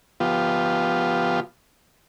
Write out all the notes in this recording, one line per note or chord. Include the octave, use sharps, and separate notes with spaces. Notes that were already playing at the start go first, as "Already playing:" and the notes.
F3 B3 F4 G4